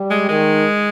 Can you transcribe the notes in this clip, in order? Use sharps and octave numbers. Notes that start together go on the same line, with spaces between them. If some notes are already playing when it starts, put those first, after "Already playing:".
Already playing: G3
G#3
D#3 G#3